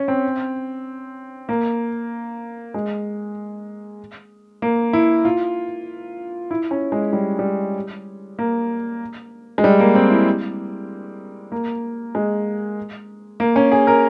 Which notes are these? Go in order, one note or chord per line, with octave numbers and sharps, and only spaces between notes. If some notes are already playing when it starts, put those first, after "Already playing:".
Already playing: C#4
C4
A#3
G#3
A#3
E4
F4
E4
C#4
G#3
G3
G3
A#3
G#3
G3
A#3
C4
E4
A#3
G#3
A#3
C#4
G#4
A#4